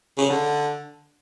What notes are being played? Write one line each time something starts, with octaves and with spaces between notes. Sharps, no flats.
C#3
D3